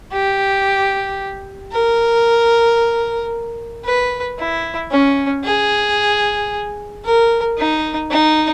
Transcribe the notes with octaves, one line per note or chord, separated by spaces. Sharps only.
G4
A#4
B4
E4
C#4
G#4
A#4
D#4
D#4